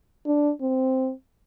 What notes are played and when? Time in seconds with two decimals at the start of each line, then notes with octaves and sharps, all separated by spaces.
0.26 D4
0.62 C4